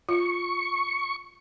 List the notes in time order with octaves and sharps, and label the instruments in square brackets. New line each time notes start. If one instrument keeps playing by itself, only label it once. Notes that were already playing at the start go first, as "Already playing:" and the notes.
[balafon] F4 [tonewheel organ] C#6